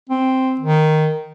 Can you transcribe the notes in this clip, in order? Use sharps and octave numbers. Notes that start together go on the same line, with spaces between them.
C4
D#3